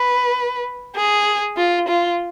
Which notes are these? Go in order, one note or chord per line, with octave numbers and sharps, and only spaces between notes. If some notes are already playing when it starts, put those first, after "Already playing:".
Already playing: B4
G#4
F4
F4